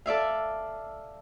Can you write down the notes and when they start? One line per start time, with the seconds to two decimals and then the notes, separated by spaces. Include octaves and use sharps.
0.06 A4 D5 E5 F5